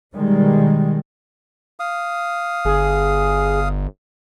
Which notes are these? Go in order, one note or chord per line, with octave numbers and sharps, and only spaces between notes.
B2 D#3 G3 G#3
F5 D#6
G1 G#4